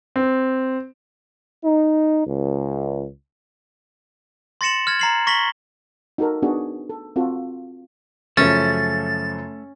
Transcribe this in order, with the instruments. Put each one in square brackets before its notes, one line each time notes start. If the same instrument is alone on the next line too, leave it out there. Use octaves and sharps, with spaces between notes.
[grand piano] C4
[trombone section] D#4
C#2
[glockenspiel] C6 A6 A#6 C#7 E7 F#7
F6 G#6 A6
A#5 C7 F#7
C#6 A#6 B6 F#7 G7
[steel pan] D#4 F#4 A4 A#4
B3 D4 D#4 F#4 G#4
A4
C4 F4 F#4 A4
[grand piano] F#2 C#3 F3 [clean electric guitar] A3 [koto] C#4 [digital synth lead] A6